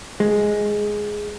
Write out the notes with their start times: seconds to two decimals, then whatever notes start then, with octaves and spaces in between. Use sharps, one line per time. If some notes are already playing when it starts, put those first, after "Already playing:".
0.20 G#3